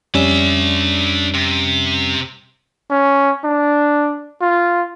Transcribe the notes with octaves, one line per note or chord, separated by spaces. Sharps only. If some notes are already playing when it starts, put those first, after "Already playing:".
F2 G3 C#4 D4 E5
C3
C#4
D4
F4